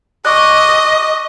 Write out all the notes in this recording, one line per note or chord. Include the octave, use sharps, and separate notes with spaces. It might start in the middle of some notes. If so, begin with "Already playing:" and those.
D#5 C#6 D6 F#6